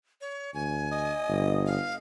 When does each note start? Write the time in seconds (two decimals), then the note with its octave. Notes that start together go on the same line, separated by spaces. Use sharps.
0.21 C#5
0.54 D2 G#5
0.92 D#5
1.28 G1
1.66 F5